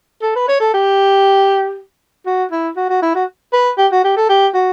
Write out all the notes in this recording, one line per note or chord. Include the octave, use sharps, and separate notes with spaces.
A4
B4
C#5
A4
G4
F#4
E4
F#4
F#4
E4
F#4
B4
G4
F#4
G4
A4
G4
F#4